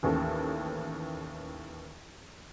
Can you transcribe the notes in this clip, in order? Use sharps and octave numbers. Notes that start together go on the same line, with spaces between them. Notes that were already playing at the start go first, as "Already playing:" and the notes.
A1 D#2 C#4 A4